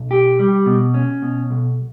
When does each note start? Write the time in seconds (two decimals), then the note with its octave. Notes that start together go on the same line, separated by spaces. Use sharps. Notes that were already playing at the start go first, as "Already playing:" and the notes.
Already playing: B1
0.11 G4
0.39 G3
0.66 B2
0.94 C#4
1.22 B2
1.50 B1